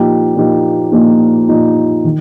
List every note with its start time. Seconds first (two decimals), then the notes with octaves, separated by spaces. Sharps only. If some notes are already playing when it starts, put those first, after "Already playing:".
Already playing: A#2 F3 A#3 D#4 G4
0.35 A#2 F3 A#3 D#4 G4
0.92 A#2 F3 A#3 D#4 G4
1.48 A#2 F3 A#3 D#4 G4
2.05 D#3